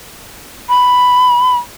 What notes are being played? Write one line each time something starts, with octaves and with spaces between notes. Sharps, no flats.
B5